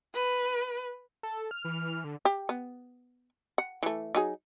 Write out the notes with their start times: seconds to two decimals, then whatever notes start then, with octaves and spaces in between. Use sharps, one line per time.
0.14 B4
1.23 A4
1.51 F6
1.64 E3
2.04 D3
2.25 G4
2.49 B3
3.58 F#5
3.83 E3 A3
4.15 F#3 D#4 G#4